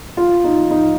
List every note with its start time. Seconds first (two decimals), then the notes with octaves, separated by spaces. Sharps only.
0.17 F4
0.44 D#4
0.71 D#4